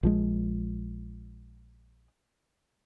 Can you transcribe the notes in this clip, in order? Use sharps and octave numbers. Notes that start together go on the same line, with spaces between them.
A#1 F3 G#3